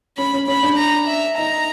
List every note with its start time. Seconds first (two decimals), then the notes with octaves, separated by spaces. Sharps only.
0.18 C#4 B5
0.33 C#4
0.48 C#4 B5
0.63 D4
0.78 A#5
1.08 E5
1.38 D#4 A#5